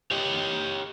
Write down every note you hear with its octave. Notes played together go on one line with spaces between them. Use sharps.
G4 C#5 D#5 G5